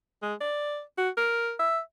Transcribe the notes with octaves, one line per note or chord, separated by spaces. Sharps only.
G#3
D5
F#4
A#4
E5